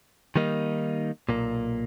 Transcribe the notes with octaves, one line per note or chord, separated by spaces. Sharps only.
D#3 G3 A#3 D#4
B1 A#2 A#3